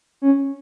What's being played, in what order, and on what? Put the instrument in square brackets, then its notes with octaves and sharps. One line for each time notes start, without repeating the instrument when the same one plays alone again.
[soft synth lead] C#4